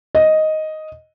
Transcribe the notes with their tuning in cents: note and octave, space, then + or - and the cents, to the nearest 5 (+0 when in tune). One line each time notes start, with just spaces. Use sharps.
D#5 +5